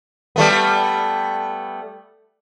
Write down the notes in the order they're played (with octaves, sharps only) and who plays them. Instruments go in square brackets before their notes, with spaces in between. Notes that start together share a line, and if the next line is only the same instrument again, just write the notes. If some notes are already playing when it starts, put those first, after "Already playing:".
[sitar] G3 A3 B3